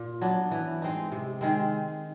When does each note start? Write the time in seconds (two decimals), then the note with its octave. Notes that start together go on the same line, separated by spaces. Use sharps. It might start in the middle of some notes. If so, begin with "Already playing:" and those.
Already playing: A#2
0.21 F#3 B3 D4
0.51 E3
0.82 G#3 C4 D#4
1.12 C3
1.41 D#3 G#3 C4